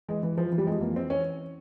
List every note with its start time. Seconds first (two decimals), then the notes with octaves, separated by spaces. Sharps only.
0.08 E3 G#3
0.23 E3
0.37 E3 F3
0.52 E3
0.58 G3
0.67 F2 G#3
0.81 E3 A#3
0.95 E3 C4
1.10 E3 C#4